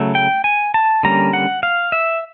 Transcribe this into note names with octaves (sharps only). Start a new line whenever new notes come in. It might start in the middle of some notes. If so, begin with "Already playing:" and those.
Already playing: C#3 F#3 A3
G5
G#5
A5
D3 G3 A#3 C#4 A#5
F#5
F5
E5